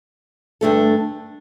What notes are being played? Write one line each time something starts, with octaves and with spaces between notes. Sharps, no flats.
G2 D3 A3 D4 A4